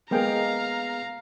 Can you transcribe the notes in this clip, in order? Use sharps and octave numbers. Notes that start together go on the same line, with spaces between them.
G#3 A#3 B3 G#4 F5 G5 A#5